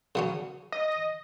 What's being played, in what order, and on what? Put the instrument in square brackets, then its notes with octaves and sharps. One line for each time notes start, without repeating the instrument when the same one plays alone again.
[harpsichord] C#3 F#3 C#4
[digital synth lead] D#5